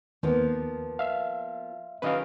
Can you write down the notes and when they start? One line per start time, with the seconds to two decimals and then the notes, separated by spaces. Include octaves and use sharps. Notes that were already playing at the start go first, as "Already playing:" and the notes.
0.23 D#2 F3 A#3 B3
0.99 E5 F5
2.02 D#3 F#3 C#4 B4 D#5 F5